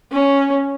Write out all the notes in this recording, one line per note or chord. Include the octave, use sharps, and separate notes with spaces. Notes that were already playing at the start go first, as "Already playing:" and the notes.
C#4